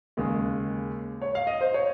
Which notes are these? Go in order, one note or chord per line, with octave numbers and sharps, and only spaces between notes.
D#2 C#3 G#3
C#5
F5
D#5
C5
C#5